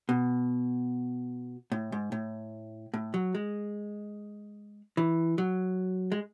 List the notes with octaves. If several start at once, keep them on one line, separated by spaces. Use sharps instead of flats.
B2
A2
G#2
A2
A2
F#3
G#3
E3
F#3
G#3